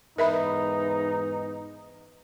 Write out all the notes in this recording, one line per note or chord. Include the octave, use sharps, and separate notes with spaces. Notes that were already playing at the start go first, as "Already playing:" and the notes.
E2 G#2 D#4 A#4 B4 E5 B5